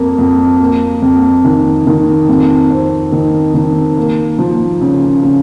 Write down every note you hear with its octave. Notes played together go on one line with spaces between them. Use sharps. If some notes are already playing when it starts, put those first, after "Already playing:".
Already playing: F2 A#3
F2
A#3
F2
D#3
D#3
F2
C4
D#3
D#3
A#3
F3
C#3
C#3